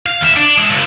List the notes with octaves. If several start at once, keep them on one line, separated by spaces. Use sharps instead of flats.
F5
D#2 E5
D4
G#3 A4
F#2 C#3